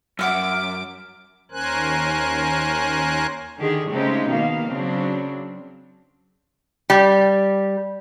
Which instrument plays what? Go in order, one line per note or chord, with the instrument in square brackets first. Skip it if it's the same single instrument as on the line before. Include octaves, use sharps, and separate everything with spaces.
[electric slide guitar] F#2 [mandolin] E5 F#5 E6 [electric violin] D6 D7 [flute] F6
[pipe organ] D#2 C#4 A#4 C5 G#5 F#6
[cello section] D3 D#3 G4 G#4
C#3 G#3 A3 C4 D#4 G4
B2 D#3 A#3 B3 F5
C#3 F#3 C4 D4
[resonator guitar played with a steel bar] G3